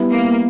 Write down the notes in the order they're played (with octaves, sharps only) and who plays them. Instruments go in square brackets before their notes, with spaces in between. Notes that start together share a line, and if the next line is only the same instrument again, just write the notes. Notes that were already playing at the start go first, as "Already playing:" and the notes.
Already playing: [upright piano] G3 B3 E4
[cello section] A#3